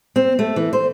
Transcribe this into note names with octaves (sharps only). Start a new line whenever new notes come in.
C4
A3
E3
C5